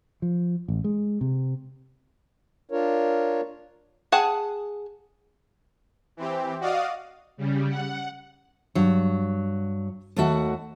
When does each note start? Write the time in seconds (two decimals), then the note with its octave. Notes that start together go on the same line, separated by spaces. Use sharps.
0.22 F3
0.68 A1
0.84 G#3
1.21 C3
2.72 D4 F4 A#4 C#5
4.12 G#4 F#5 A5
6.17 E3 C4 G4
6.60 F#4 D5 D#5 F5 D#6
7.37 C#3 G3
7.69 F#5
8.75 G2 F#3
10.16 D#2 A3 F#4 F#5